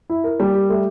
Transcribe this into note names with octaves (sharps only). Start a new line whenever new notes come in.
E4
A#4
G3 A#3
G4
A3